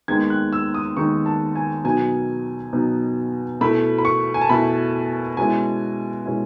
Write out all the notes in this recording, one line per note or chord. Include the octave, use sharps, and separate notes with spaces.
D#2 D#3 G#3 B3 D#4 G#6
F#6
E6
D#6
D#2 D#3 G#3 B3 D#4 C#6
A5
G#5
B2 F#3 B3 D#4 G#5
B2 F#3 B3 D#4
B2 A3 E4 B5
B5
C#6
G#5
A5
B2 A3 E4 B5
B2 G#3 C#4 E4 G#5
B2 G#3 C#4 E4